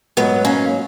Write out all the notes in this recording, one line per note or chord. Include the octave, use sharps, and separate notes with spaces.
G#2 F#3 B3
A#3 C#4